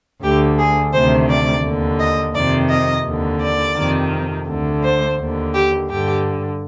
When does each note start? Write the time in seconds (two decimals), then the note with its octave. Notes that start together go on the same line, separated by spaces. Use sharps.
0.22 D2 D3 G4
0.58 G#4
0.93 D2 C3 D#3 C5
1.29 D5
1.64 D#2 D3
1.99 D#5
2.34 F2 C3 D#3 D5
2.70 D#5
3.05 D#2 D3
3.41 D5
3.77 F2 C3 D#3
4.47 D2 D3
4.83 C5
5.18 D#2 D3
5.53 G4
5.89 G2 D3 G4